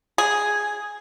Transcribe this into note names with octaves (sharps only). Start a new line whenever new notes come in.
G#4